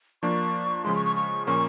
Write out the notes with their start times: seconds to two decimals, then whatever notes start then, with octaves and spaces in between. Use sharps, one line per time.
0.23 F3 A#3 D4 C#6
0.84 C#3 F3 G#3 C6
0.96 C#6
1.06 C#6
1.16 C#6
1.47 A#2 F3 A#3 C#4 C#6